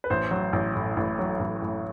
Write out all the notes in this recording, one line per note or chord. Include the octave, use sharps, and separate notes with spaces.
B4
A1 C5
F#3
A1
A2
A1
F#3
A1
A2